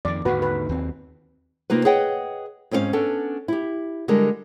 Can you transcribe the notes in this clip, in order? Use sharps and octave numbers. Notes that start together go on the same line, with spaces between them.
F2 D#3 D5
D#2 G#2 D3 F#4 B4
B4
D#2 C4
C3 A#3 D#4 F4 B4
G#4 B4 C#5 D#5 F#5 G5
G#2 C4 C#4 C5 F5
B3 C#4 D4 A4
E4 G4
D3 G3 G#3 A#4